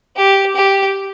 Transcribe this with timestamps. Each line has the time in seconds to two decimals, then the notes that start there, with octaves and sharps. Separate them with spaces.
0.16 G4
0.56 G4